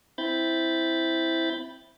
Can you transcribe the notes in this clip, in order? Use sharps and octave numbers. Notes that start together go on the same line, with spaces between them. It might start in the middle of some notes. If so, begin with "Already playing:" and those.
C4 E4 B5 G6 A6